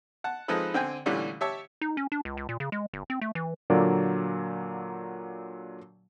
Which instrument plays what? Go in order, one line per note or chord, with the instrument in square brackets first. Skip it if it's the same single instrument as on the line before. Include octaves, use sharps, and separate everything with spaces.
[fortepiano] F#5 A5
F3 G#3 C4 D#4 A4 B4
D3 C4 G5 G#5
A#2 D3 E3 G3 A3 C#4
G4 C#5 E5 A5
[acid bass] D#4
C#4
D4
C#2
C#2
A#2
C#3
G#3
G1
C4
A3
E3
[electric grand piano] A#2 D3 F#3 A#3 D5